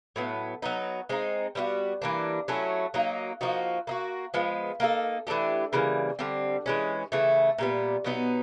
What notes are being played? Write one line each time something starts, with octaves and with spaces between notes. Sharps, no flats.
A2 F#3 B3
F#3 B3 D#4
G#3 C4 D#4
G3 B3 D#4 F#4
E3 G3 A#3 D4
F#3 A3 C#4 E4
F#3 A#3 D#4
F3 A#3 D#4 F#4
A#3 D#4 F#4
F3 G#3 B3
A#3 D#4 F#4 A4
E3 A3 D4 G4
C#3 E3 G3 A#3
D3 G3 C4
E3 G#3 C#4
C#3 E3 A3
A#2 G3 B3
B2 F#3 B3 D#4